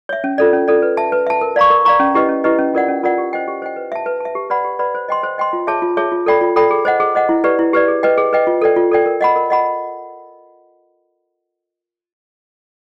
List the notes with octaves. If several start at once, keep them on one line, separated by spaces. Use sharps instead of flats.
C#5 E5
C#4
F4 A4 D5
C#4
F4 A4 D5
B4
E5 A5
B4
E5 A5
A#4
D5 F5 A#5 C#6
A#4
D5 F5 A#5 C#6
C#4
E4 G4 B4 D#5
C#4
E4 G4 B4 D#5
C#4
F4 A#4 D5 F#5
C#4
F4 A#4 D5 F#5
G4
C5 D#5 G5
G4
C5 D#5 G5
B4
E5 A5
B4
E5 A5
G4
B4 D5 F#5 B5
G4
B4 D5 F#5 B5
C5
D#5 G5 C6
C5
D#5 G5 C6
F4
G#4 C#5 E5 A5
F4
G#4 C#5 E5 A5
F4
A4 D5 G5 B5
F4
A4 D5 G5 B5
G#4
C5 D#5 F#5
G#4
C5 D#5 F#5
E4
G4 B4 D5
E4
G4 B4 D5
G#4
B4 D#5 G5
G#4
B4 D#5 G5
F4
A4 D5 G5
F4
A4 D5 G5
A#4
D#5 F#5 B5
A#4
D#5 F#5 B5